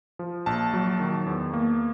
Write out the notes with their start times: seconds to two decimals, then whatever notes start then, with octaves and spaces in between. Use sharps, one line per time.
0.19 F3
0.46 A#1 A5
0.73 F#3
1.00 D#3
1.26 E2
1.53 A#3